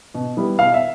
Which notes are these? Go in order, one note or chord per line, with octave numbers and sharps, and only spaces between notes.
B2
G3 B3 E4
B2 F5
E5